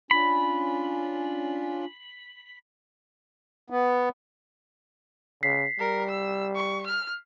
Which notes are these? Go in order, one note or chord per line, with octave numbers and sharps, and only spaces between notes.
C#4 D4 F4 B5
B3
C#3 B6 C7
G3 A#4
E6
C#6
F6